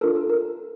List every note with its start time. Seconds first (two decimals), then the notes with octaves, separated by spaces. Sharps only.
0.01 D4 F4 A4 A#4
0.15 A4
0.29 A#4